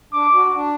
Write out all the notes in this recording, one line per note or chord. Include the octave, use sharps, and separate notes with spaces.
D4 D6
F#4
D4